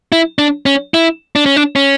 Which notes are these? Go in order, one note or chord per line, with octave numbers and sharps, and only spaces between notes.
E4
D4
C#4
E4
D4
C#4
D4
C#4